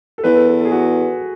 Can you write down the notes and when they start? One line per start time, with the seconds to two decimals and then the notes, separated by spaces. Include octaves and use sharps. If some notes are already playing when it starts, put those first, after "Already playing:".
0.18 A4
0.24 E2 B4
0.35 A4
0.47 A4
0.60 A4
0.65 G#4
0.72 F#4